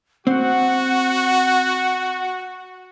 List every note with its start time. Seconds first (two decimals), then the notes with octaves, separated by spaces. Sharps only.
0.27 C4 F#4 F#5